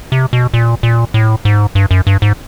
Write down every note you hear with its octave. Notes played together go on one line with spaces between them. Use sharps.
C3
B2
A#2
A#2
A2
G#2
G2
F#2
G2
G#2